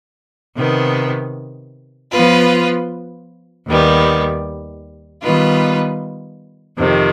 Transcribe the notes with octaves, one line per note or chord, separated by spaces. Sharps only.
C3 D#3 B3
F3 B3 F4 B4
D#2 D#3 G3 B3
D#3 G3 B3 F4 B4
F2 C3 D#3